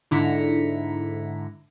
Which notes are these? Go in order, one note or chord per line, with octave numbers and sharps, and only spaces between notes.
G#2 D3 E4 A#5 B6 C#7